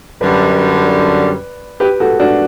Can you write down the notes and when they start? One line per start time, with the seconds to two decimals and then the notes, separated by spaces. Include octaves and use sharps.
0.21 F#2 D3 G3 B4 D5
1.80 G4 B4
2.00 F#4 A4
2.20 D4 F#4